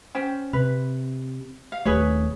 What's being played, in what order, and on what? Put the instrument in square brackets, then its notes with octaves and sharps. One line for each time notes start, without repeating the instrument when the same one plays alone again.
[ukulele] C#4 C5 G5
[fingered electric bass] C3 [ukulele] B4
[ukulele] F5
[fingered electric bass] D#1 A3 [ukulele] G#4 B4 C#5